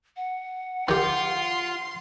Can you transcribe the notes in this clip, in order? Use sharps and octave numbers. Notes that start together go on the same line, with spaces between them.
F#5
D#3 F4 G4 C6